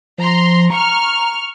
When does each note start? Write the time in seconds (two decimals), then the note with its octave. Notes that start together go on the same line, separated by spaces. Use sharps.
0.18 F3 A#5 C6
0.70 A#5 C#6 F6